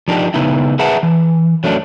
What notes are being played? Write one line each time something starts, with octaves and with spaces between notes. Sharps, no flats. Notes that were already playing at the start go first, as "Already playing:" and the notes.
F3 D4 D#4 G4
C#3 B3 D#4 E4
G#4 B4 E5 F#5 A5 A#5
E3
F#3 A3 C#4 D4